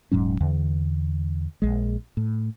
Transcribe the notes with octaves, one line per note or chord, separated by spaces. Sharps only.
D#1 G#2 F#3 C#4
E2 D3
A#1 G#3
A2